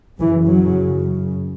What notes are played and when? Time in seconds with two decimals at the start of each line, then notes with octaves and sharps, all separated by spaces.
0.19 F#2 C#3 E3
0.49 F#3